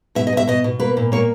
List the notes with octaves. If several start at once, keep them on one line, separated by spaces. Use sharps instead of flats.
B2 E5
D#5
B2 E5
B2 D#5
B2
A#3 B4
A#2
A#3 C#5